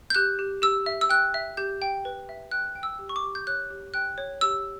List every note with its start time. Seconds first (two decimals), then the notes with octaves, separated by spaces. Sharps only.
0.10 G6
0.15 G4 F#6
0.39 G4
0.62 G4 E6
0.86 E5
1.01 E6
1.09 G5 F#6
1.34 E5
1.57 G4 G6
1.82 G5
2.05 B4
2.29 E5
2.51 G5 F#6
2.76 G5
2.83 E6
2.99 G4
3.09 C#6
3.16 D6
3.24 G4
3.35 G6
3.47 C#5 F#6
3.70 G4
3.94 G5 F#6
4.18 C#5
4.41 G4 E6